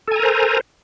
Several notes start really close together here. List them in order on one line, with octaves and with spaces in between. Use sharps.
A4 G#5 A#5 A#4 C5